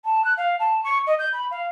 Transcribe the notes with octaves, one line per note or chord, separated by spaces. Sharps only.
A5
F#6
F5
A5
C#6
D#5
G6
B5
F5